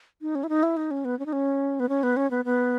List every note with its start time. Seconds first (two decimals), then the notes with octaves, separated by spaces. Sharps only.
0.21 D#4
0.35 C#4
0.44 E4
0.49 D#4
0.63 E4
0.77 D#4
0.91 C#4
1.05 B3
1.19 C#4
1.26 D#4
1.33 C#4
1.80 B3
1.89 C#4
2.03 B3
2.17 C#4
2.31 B3
2.45 B3